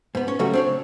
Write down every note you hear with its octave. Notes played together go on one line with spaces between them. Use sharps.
G#2 B3
C#4
C#3 F#3 G3 A3 F#4
C4 D4 C#5